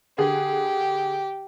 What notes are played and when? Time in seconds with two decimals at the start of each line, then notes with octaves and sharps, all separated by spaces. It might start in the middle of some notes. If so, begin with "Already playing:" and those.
0.18 D3 G4 G#4